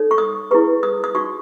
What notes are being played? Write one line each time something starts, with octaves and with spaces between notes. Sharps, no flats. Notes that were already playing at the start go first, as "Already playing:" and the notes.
Already playing: D#4 A4 C#5
C#6
D#6
E4 G#4 B4 C#6
D#6
D#6
D#4 F#4 C#5 C#6